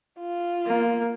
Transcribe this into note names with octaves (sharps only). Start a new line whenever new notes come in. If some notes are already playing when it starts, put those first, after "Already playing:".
F4
A#3